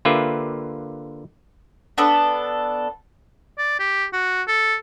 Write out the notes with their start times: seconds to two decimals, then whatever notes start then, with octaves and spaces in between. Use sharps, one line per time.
0.05 D3 A#3 F4 G4 B4 E5
1.98 B3 D4 A4 B4
3.58 D5
3.79 G4
4.13 F#4
4.48 A4